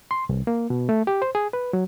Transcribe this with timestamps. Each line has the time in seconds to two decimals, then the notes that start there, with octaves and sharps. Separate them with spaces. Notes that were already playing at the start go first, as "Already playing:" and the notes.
0.11 C6
0.29 C2
0.47 A#3
0.70 B2
0.89 A3
1.07 G4
1.22 C5
1.35 G#4
1.53 B4
1.73 F#3